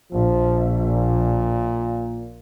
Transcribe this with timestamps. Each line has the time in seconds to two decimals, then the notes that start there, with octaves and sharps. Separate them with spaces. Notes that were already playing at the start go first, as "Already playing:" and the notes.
0.12 A#1 F3
0.80 A#2